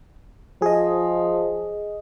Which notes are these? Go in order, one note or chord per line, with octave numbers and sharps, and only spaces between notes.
F3 G#4 D#5